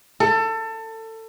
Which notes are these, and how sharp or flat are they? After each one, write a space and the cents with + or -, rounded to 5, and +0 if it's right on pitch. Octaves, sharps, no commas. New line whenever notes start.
A4 +25